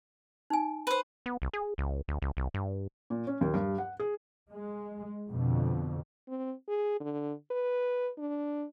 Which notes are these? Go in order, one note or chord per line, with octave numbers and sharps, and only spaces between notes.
D#4 G#5
B4 C5
B3
C2
G#4
C#2
D2
C#2
C2
G2
A#2
C#4
D#2
G2
F#5
G#4
G#3
F2 B2 D3
C4
G#4
D3
B4
D4